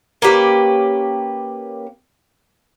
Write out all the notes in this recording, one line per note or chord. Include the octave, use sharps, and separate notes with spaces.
A#3 C#4 G4 B4